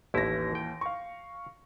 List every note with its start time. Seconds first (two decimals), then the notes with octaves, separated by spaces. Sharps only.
0.14 A1 D#2 E3 E4 A#6
0.55 G5
0.81 F5 C#6